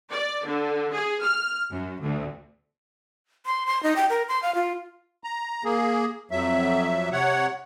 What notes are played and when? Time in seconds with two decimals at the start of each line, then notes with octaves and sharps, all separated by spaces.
0.12 D5
0.46 D3
0.94 G#4
1.23 F6
1.70 F#2
2.01 D2
3.46 C6
3.67 C6
3.83 D#4
3.96 G5
4.10 A#4
4.29 C6
4.43 F5
4.55 F4
5.24 A#5
5.64 A#3 G#4
6.31 F2 F#3 E5
7.12 C3 C#5 F#5